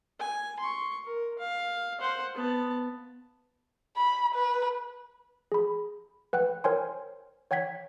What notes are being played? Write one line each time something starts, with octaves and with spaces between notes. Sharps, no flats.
G#5
C6 C#6
A#4
F5
C5 F#5
B3 A5
B5
B4
G#4 B5
B4 F#5 G5 F#6
A#4 C5 C#5 G5 G#5 C6
C#5 F#5 G5 G#6 B6